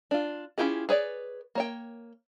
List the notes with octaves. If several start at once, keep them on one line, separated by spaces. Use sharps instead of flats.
D4 F4
C#4 E4 F4 G4 G#4
G#4 B4 C#5 D5
A#3 C#5 G5